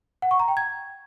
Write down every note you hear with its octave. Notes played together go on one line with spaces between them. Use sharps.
F#5
C#6
A#5
G5
G#6